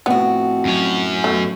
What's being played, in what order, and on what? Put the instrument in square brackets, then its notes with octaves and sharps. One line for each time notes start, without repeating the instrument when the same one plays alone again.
[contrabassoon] F2 [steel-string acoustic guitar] A2 F#4 [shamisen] B3
[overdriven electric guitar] F#2 C#4
[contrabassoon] B2 [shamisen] A3